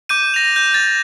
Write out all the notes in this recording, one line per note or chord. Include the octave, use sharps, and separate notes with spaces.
D6 G6 D#7
A#6 F7
G6
A6